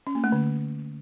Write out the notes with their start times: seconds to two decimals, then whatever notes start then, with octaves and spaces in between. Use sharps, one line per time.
0.07 C#4
0.15 A#3
0.24 A3
0.32 D3